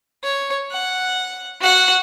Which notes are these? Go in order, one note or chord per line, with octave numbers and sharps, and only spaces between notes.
C#5
F#5
F#4 F#5